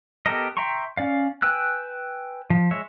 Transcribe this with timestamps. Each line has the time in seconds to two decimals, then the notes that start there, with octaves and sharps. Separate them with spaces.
0.26 B3 G4 A4 A#4 D#5
0.57 E5 G5 A#5 C6 C#6
0.97 C#4 D5 F5
1.42 B4 G5 G#5 E6 F#6
2.50 F3
2.71 G#3 C#5 E5